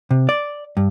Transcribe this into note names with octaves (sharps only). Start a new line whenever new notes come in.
C3
D5
G2